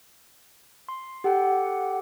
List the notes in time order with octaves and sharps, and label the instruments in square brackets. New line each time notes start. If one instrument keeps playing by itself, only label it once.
[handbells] C6
[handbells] G4 A4 G5 [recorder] F#5